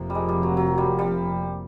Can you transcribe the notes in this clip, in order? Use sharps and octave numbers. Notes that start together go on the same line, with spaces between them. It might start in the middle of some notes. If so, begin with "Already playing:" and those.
Already playing: F1 F2 C3 F3 A#3
G3
G#3
G3
F#3
F#3
G3
G3